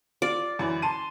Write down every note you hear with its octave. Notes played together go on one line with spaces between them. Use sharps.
F4 D5
F#2 E3
A5 C6 D#7